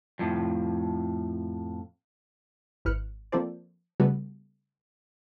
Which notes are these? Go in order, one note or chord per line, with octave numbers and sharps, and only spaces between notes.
F2 A2
G#1 E4 B4 F6 F#6 C#7
F3 A#3 C4 A4 C5 D5
C#3 G3 A3 B3 F#4 B4